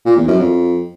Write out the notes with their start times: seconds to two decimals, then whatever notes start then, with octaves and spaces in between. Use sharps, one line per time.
0.06 A#2
0.17 E2
0.28 F#2
0.39 F2